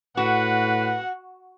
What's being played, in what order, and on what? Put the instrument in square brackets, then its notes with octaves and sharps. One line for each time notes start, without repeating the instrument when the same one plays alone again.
[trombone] A2 [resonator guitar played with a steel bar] F#4 [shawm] B4 [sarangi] F#5